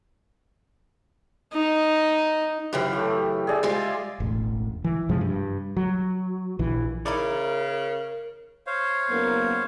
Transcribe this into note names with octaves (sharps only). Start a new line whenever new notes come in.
D#4
F#2 C#3 E3 G4
A3 G4
G#4 D5 E5
G3 G#3 F4
E1 A1
E3
F#2 C3 F3 G#3
G2
F#3
A#1 E3
C#3 D#4 E4 A#4 D5
C5 C#5 F5
F#1 A#3 B3